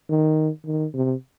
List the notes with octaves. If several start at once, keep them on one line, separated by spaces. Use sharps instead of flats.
D#3
D#3
C3